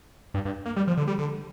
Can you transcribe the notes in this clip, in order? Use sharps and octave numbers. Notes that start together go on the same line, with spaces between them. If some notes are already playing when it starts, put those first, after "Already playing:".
G2
G2
A#3
G3
F3
D3
G3
D3